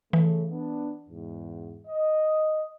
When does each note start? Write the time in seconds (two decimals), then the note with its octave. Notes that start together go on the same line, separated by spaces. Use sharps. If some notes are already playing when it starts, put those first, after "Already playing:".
0.13 C#3 E3 A3
0.50 B3 D4
1.10 E2 G#2
1.88 D#5